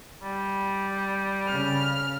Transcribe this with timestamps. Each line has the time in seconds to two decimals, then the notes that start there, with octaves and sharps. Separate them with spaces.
0.23 G3
1.47 C#3 F6